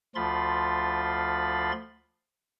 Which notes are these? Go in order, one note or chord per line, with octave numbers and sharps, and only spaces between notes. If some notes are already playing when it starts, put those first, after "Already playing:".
D2 F3 F4 B5 C6 A6